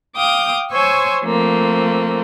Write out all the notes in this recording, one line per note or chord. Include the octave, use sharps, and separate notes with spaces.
F5 G5 D6 D#6 G6
C5 C#5 G#5 C6 C#6 E6
F3 A3 A#3 C4